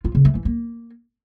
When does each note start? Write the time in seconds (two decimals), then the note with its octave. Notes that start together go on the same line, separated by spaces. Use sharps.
0.04 F4
0.15 C#3
0.25 A3
0.35 E3
0.45 A#3